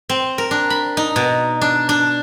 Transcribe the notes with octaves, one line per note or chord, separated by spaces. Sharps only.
C4
A#4
D4
B5
D#4
B2
D4
D4